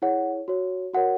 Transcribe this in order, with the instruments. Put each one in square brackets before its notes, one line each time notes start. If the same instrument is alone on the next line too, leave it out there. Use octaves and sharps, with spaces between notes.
[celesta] E4 G#4 C#5 F#5
F#4 C#5
F#4 A#4 C#5 F#5